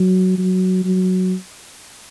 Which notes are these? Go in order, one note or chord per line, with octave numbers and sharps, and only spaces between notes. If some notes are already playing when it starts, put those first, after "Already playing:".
Already playing: F#3
F#3
F#3